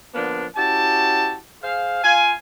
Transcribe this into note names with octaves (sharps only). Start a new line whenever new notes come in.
D3 F3 A#3 B3 D4
C#4 E4 F#4 G4 A5
G#4 C5 F5
F4 F5 G#5